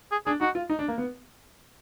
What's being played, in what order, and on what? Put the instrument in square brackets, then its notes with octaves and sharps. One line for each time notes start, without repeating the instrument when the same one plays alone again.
[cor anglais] G#4
[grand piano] D4 [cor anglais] G#4
[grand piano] D#4 [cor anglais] F#4
[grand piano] F4
D#4
D4
A#3
B3